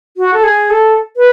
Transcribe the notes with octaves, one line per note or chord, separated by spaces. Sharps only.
F#4
A4
G#4
A4
B4